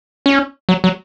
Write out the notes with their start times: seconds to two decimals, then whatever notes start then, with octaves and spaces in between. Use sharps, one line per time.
0.26 C#4
0.69 F#3
0.84 F#3